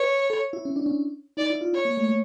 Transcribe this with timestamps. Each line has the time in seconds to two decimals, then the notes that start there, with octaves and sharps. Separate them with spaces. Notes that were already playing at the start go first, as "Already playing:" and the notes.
Already playing: B4 C#5
0.30 A4
0.53 E4
0.65 C#4
0.76 D4
0.86 C#4
1.37 D#4 D5
1.50 E4
1.61 F4
1.73 E4 C#5
1.85 A#3
1.97 A3
2.09 G#3